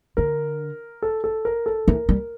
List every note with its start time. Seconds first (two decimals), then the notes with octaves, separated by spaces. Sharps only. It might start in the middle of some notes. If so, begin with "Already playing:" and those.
0.17 D3 A#4
1.02 A4
1.24 A4
1.45 A#4
1.66 A4
1.88 E3 A#4
2.09 G3